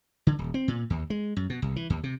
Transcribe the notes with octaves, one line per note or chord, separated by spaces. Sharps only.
D3
D#1
C4
A#2
D#2
G#3
F#2
B2
C2
E3
D#2
C3